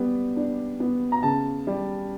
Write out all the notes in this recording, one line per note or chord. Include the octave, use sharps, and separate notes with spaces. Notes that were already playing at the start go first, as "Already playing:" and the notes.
Already playing: G3 B3
D4
B3
A#5
C#3 A5
G3